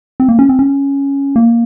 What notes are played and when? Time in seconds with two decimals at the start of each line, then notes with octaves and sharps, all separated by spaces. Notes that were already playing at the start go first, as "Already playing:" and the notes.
0.20 C4
0.29 A#3
0.39 C#4
0.49 C4
0.59 C#4
1.36 A#3